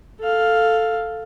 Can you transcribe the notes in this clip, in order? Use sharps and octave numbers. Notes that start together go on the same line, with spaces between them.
A4 F5